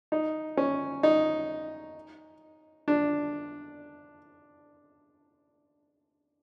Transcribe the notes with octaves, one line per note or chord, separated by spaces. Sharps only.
D#4
C#4
D#4
D4